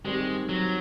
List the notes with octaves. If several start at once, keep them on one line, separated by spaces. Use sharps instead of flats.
G#2 D#3 G3 G#3 C4
F#3